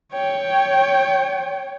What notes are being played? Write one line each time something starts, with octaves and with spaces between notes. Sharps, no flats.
C#5 G5